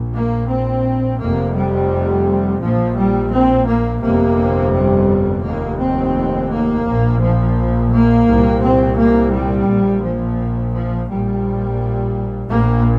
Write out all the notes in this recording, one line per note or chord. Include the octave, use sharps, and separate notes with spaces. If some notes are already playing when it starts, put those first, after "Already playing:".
Already playing: A#1 A#2
A#3
C4
F1 F2 C3 A#3
G3
A#1 A#2 F3
G3
C4
A#3
G1 F2 C3 A#3
G3
F1 D#2 A#3
C4
A#3
A#1 A#2
F3
A#3
C2 A#2
C4
A#3
G3
A#1 A#2
F3
F3
A#1 A#2 G3
A#1 A#2 A#3